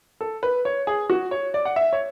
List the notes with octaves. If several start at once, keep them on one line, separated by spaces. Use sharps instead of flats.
A4
B4
C#5
G#4
F#4
C#5
D5
F#5
E5
C#5